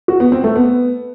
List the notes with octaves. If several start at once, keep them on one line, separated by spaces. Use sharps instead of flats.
F#4
B3
C4
A3
B3